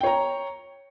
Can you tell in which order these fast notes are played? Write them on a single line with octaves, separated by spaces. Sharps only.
G5 C#5 A#5